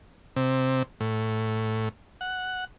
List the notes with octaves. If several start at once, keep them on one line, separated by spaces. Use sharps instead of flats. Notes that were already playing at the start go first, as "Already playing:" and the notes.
C3
A2
F#5